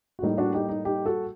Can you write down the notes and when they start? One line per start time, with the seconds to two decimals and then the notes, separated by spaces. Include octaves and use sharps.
0.19 F#4
0.22 A2 G3 A#3 D#4
0.38 D4 F#4
0.54 D#4 G4
0.69 D#4
0.85 D#4 G4
1.06 F#4 A4